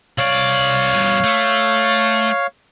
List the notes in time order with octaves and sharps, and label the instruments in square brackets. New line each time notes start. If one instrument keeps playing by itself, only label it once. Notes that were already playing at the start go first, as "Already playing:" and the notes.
[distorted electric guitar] C2 D5 [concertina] C#5 F5
[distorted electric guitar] G2 B2
A3